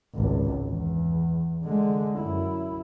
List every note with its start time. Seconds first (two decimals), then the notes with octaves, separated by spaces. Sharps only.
0.15 G#1 C#2
0.69 E2
1.64 D3 G#3
2.19 F#2 E4